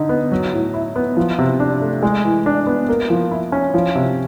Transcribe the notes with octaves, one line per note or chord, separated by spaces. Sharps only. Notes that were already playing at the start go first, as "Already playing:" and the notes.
Already playing: D3 D#4
B3
F#3
A2
E4
B3
F3
C3
D4
A3
G#3
E3
D4
B3
A#3
F3
E4
C#4
F3
C3